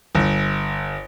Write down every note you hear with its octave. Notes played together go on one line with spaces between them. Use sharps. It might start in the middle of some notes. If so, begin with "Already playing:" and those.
G1